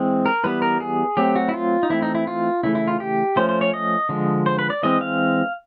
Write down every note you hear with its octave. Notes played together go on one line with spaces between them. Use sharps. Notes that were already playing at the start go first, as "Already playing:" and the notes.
Already playing: E3 G#3 C4
A#4
E3 G3 B3 B4
A#4
G#4
F#3 A3 C4 G4
F#4
E4
F4
D#4
E3 A3 C4 E4
D#4
E4
F4
C#3 E3 A3 E4
E4
F4
G4
F3 A3 C#4 C5
C5
C#5
D#5
D3 F3 G#3
C5
B4
D5
E3 G#3 C4 D#5
F5